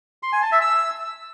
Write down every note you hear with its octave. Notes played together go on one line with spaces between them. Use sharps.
C6
G#5
A5
E5
E6